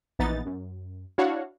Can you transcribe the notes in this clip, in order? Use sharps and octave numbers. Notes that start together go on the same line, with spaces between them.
A#1 E3 B3 D#4 A6
F#2
D4 E4 F#4 C#5 F5 F#5